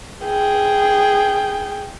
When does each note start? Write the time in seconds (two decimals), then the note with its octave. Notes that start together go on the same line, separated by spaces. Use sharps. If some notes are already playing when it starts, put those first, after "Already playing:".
0.24 G#4 G5